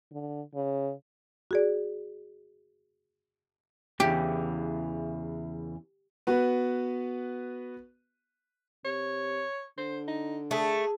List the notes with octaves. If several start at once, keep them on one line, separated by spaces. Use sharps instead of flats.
D3
C#3
F#4 G#4 D5
E2 C#3 E3 G4
B3 F#4 B4
C3 C#5
D3 C5
D#4
A3 G#4 A4